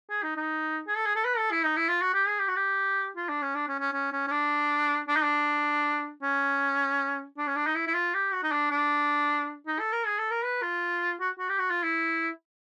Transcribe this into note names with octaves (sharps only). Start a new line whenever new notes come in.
G#4
D#4
D#4
G#4
A4
G#4
A4
B4
A4
E4
D#4
E4
F4
F#4
G4
G#4
G4
F#4
G4
F4
D4
C#4
D4
C#4
C#4
C#4
C#4
C#4
D4
D4
D#4
D4
C#4
D4
C#4
D4
D#4
E4
E4
F4
G4
F#4
D#4
D4
D4
D#4
A4
A#4
G#4
A4
A#4
B4
F4
F#4
F#4
G4
F#4
F4
E4